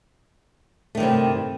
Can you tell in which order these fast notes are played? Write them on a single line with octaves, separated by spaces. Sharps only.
A3 D#3 G2 C3